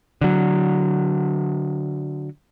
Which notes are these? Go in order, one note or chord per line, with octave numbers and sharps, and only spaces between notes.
D3 F#3